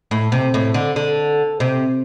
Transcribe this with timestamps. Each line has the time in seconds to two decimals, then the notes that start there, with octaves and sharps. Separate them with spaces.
0.11 A2
0.32 C3
0.54 A2
0.74 D3
0.96 D3
1.60 C3